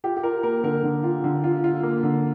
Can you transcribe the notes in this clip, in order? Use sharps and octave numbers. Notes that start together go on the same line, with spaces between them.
F4 G4
G4
F4 A#4
A#3 A#4
D3 A#4
D3
F4
D3
F4
F4
A#3
D3